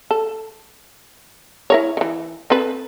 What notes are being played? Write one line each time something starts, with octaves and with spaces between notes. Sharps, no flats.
A4
E4 A#4 C#5
D#3 E3
C4 A4 B4